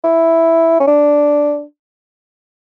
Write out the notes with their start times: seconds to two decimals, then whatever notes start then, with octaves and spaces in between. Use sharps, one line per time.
0.04 E4
0.80 C#4
0.87 D4